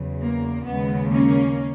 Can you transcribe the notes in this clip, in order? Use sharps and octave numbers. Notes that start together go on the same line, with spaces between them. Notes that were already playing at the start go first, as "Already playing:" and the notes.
Already playing: E2 C#3 F#3
A#3
D#2 C#3 G#3 B3
A#3 C#4